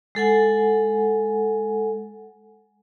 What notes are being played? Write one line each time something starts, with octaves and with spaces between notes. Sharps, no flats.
G#3 A4 F#5 G#5